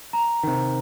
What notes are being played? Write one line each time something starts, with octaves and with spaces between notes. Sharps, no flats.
A#5
C3 D#3